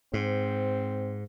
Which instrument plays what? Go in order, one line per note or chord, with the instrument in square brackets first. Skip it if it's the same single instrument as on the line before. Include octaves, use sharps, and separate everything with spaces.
[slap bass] G#2 [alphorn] C4